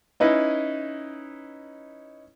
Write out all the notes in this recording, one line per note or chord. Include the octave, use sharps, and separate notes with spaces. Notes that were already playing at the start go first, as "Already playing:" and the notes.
C#4 D#4 E4 B4 D#5